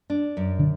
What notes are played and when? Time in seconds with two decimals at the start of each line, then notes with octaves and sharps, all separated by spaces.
0.10 D4
0.37 F#2
0.59 D3